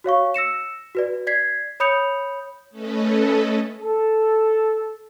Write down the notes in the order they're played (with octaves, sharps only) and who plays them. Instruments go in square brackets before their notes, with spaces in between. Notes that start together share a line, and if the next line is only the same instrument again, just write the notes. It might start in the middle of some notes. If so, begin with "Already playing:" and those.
[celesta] F#4 C#5 F5 C#6
E6 A#6 C#7 E7
F#4 B4 D5
D5 G#6 B6 C7
C#5 B5 D#6 G6 C#7 F7
[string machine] A3 C#4 A4 B4 D#5
[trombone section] A4